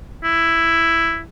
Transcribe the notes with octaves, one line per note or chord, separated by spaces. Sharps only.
E4